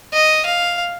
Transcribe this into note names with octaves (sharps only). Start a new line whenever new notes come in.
D#5
F5